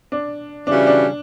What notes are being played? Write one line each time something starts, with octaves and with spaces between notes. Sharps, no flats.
D4
C#3 E3 G3 C#4 D4 F#4
D4